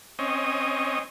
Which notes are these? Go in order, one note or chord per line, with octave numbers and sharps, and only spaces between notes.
C4 C#4 D#5